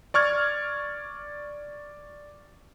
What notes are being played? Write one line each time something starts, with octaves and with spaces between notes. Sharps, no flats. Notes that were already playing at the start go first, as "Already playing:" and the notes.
D5 C#6 F6 G#6